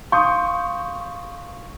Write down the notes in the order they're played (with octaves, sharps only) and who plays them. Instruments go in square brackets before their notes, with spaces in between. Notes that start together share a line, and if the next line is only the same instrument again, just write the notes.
[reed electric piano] F5 C6 D#6 [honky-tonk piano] C#6 G6